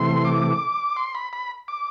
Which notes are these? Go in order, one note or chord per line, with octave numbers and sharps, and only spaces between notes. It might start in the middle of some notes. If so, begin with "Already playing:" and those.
Already playing: C3 E3 A3 C6
D6
C6
B5
B5
D6